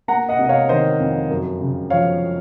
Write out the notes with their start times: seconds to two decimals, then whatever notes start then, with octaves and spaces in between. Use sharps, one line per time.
0.08 A#3 F#5 A#5
0.29 D#5 F#5
0.39 C3
0.44 D#5
0.49 C#5 F5
0.69 D#3 C5 D#5
1.00 F2
1.30 F#2
1.61 C#3
1.90 F3 C#5 F5